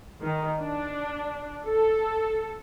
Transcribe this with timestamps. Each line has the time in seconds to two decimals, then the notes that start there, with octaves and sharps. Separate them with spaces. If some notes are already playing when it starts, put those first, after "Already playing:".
0.23 D#3
0.60 D4
1.65 A4